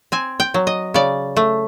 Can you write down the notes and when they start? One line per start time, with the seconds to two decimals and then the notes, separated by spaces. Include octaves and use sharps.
0.12 C4 G#5
0.40 G5
0.54 F#3
0.67 D#5
0.94 C#3 D5
1.36 A3